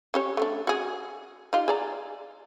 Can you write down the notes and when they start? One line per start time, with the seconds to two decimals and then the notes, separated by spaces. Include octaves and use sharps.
0.14 C#4 G4 C#5
0.37 A3 B3 D4
0.67 F#4 G#4
1.53 D#4 F4 G4
1.68 G#4 D5 A#5